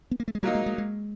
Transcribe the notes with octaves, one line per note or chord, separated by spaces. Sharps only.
B3
A#3
A3
G#3
A#2 F#3 G3 A#3 D#4
G#3
G#3
G#3